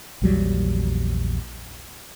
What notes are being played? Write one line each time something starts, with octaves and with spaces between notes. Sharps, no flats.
A#1 E2 F#3 G3